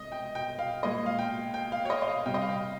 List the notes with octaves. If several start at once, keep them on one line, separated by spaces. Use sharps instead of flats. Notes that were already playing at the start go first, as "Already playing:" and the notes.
Already playing: C3 G#3 D#5
G5
G5
F5
A#2 G#3 D#5
F5
G5
G5
F5
C#5
D#5
D#5
F5
C3 G3 G5
D#5
F5
G5